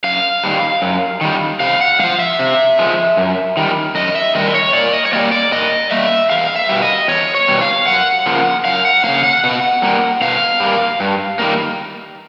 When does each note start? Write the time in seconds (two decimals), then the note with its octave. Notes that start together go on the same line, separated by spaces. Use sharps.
0.04 F#2 F5
0.44 D#3 G3
0.82 F#2
1.21 D#3 G3
1.60 C3 F5
1.81 F#5
1.99 F3 G#3 F5
2.20 E5
2.39 C3
2.79 F3 G#3
3.17 F#2
3.57 D#3 G3
3.95 F#2 D#5
4.15 E5
4.35 D#3 G3 D#5
4.54 C#5
4.73 A#2 D5
4.93 D#5
5.06 C#5
5.13 G3 A#3 D5
5.32 D5
5.52 A#2 D#5
5.91 G3 A#3 E5
6.30 E2 F5
6.56 E5
6.69 B2 G3
6.82 D#5
7.08 E2 C#5
7.35 C#5
7.48 B2 G3
7.61 F5
7.87 F#2 F#5
8.26 C#3 F3 A#3
8.65 F#2 F5
8.85 F#5
9.04 F3 A#3 F5
9.09 C#3
9.23 F#5
9.44 B2
9.82 G3 A#3
10.21 B2 F5
10.60 G3 A#3
11.00 G2
11.39 D#3 G3 A#3